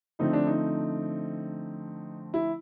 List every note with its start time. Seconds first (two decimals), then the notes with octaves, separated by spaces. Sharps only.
0.19 D3 F3 A3 C4 D#4
0.33 D4
0.47 D#4
2.34 E4